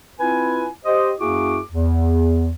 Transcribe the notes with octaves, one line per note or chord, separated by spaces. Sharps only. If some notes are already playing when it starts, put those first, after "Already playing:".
C4 E4 F4 B4 G#5
G4 C5 D#5
F#2 A#3 E4 F#4 G#4 D6
E2